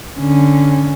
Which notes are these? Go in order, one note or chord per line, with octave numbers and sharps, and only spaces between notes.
D3 C#4